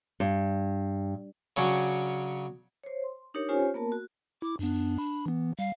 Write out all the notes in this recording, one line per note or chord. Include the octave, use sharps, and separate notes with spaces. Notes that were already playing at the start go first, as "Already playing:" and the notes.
G2
C#3 F#3 C#4 D4
C5 C#5
C6
D4 D#4 G4 A#4 C#5
C#4 F4 G4 C5 C#5 G#5
A#3 B3 A#4 A5
F#4
E4 D6
F#2 B3 D4
B5
E3 B3
G3 F5